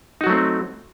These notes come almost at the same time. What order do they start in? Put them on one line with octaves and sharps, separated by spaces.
D#4 F#4 F#3 A3 C4